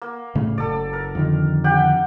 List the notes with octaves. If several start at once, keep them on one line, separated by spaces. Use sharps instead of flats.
A#3
A2 C#3 A3
F#1 A4 D5
A#4
F2 D3 D#3
G4 F#5 G5